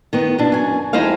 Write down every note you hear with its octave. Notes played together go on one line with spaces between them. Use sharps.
D#3 B3 D#4
B2 D4
F#2 G#5
F2 G#3 D#4 E4 C5 F5